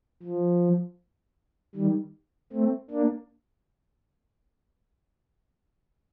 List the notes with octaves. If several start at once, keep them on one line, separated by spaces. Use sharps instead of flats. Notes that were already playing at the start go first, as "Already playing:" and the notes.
F3
D#3 G3
A3 C4
A#3 D4